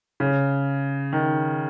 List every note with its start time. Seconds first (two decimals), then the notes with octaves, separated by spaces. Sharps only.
0.20 C#3
1.13 D#3